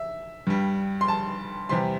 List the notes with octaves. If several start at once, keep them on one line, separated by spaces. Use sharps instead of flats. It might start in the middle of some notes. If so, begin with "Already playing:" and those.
Already playing: E5
G2 G3
C6
A5
E2 C3 G3 C6